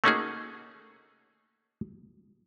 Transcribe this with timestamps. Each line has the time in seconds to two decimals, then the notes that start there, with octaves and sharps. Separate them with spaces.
0.04 A3 A#3 C#4 D#4 F#4 G#4